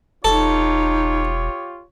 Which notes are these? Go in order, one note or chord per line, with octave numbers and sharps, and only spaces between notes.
E1 D#4 F4 G4 A4 C#5